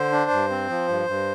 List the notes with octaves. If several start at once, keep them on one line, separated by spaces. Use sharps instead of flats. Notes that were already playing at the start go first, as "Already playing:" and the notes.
Already playing: D3 C5
D4
G2
C4
F3
G2
G2